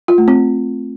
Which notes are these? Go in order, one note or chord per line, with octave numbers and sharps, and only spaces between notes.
F4
A3
C4